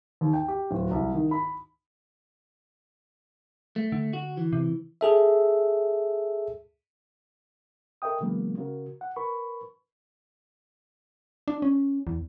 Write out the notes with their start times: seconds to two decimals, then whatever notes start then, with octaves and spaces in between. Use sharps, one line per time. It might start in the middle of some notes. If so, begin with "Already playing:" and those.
0.21 D#2
0.33 G5
0.48 G4
0.71 D1
0.91 C2
1.14 D#3
1.31 B5
3.76 A3
3.92 D3
4.13 F#4
4.37 E3
4.53 C3
5.01 G#4 A4 E5
8.02 A4 A#4 D#5 E5 G5 D#6
8.21 C#3 E3 F#3 G#3 A#3 B3
8.58 C#3 F#4 A#4
9.01 F#5
9.16 A#4 B4 B5 C#6
11.48 D4
11.62 C#4
12.07 E2